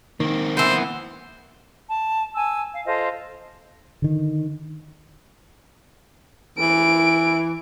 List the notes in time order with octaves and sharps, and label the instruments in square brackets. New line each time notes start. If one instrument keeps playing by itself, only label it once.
[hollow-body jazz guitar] D#3 [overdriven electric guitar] A#3 C4
[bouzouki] E3 B3 [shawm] C5
[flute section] A5
G#5 A5 E6
F5
F4 A4 C5 D#5
[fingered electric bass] D3 D#3
[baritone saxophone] E3 [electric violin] D7